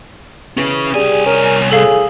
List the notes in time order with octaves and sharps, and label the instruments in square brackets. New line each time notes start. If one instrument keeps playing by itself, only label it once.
[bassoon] E3 [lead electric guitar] C#4 G#4
[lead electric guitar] C2 G#5 [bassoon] G3 [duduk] G#4
[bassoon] C#4 [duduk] A#4
[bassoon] A2 [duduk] G#4 [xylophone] A4 F5